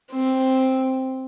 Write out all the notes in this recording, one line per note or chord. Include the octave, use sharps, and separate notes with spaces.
C4